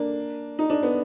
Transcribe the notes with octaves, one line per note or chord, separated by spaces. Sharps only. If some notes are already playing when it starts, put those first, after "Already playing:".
Already playing: A#3 D4
D#4
D4
B3